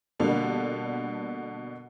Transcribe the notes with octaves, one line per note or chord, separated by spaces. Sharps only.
B2 D3 G3 A#3 D4 A4